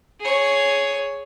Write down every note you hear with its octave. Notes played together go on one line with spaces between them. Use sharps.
G#4 C#5